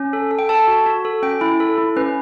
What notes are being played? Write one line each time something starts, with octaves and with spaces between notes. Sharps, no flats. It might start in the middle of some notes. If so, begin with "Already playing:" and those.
Already playing: C#4
A4
A4
G5
A4 A5
F#4
F#4
A4
C#4 G5
E4
A4
E4
C#4 B4